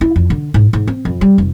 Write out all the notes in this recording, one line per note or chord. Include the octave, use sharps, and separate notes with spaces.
E4
F2
D3
G#2
G#2
C4
F2
G3
F1